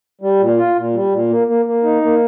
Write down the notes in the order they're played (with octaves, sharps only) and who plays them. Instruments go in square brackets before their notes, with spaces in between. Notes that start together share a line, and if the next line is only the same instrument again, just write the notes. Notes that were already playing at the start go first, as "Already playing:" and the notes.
[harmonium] G3
A#2
F4
A#2
G3
A#2
A#3
A#3
A#3
D#4
A#3